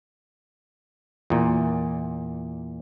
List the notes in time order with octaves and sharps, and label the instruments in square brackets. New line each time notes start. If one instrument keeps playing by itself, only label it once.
[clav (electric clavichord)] E2 A#2